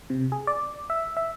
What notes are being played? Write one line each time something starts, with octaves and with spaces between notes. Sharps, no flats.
C3
G#4
D5
E5
E5